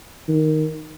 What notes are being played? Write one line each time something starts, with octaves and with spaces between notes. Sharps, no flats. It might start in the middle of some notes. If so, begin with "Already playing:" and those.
D#3